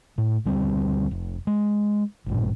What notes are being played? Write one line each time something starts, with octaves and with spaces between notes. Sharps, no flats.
A2
D2 G3 C4
F1
G#3
A1 G2 A#2